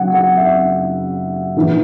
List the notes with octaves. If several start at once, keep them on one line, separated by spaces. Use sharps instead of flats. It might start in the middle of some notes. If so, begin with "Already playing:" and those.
Already playing: F#1 F#2 C#3 F#5
F#5
E5
A#1 G#2 E3